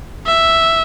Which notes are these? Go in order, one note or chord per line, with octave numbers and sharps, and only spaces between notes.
E5